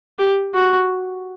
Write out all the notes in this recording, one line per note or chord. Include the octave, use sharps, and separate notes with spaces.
G4
F#4